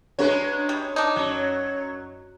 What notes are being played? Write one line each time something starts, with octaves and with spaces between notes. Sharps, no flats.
F#3 G#3 C#4 D4 B4 C#5
G3
D4 D#4
F#2 F#3